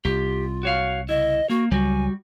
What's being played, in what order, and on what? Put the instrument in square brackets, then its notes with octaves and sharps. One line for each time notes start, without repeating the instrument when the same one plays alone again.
[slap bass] C2 [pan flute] F4 [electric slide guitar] G4
[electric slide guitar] F#4 C#5 F5
[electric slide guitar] C#3 E4 [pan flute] D#5
[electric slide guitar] A#3 [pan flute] F#4
[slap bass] C#2 F#3 [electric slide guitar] G3 F#4 [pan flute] G#5